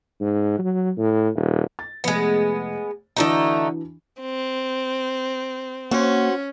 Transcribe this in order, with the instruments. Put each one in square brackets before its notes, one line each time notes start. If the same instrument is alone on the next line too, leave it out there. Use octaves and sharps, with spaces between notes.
[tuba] G#2
F#3
A2
D#1
[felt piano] A6
[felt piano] F1 A3 [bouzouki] G#3 B3
[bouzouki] D3 A3 D#4 [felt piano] E3 D4 F#4
[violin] C4
[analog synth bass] A#3 [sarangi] C#4 [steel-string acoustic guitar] F#4 C5